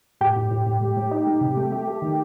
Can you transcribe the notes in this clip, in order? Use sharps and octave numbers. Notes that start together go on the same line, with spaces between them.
A2 G4
A2
A2
A2
A2
A2
D#4
A2
C3
A3
A3
A3
D#3